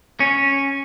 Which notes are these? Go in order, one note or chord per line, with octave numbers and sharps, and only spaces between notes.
C#4